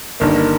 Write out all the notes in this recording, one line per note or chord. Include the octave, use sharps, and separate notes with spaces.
G1 G2 D#3 A#3
A#3